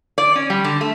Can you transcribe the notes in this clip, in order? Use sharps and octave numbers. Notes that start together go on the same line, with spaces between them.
D5
C#4
G3
D3
A3